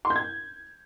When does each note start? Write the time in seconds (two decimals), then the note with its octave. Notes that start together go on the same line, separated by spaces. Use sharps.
0.05 C6
0.10 G6
0.16 G#6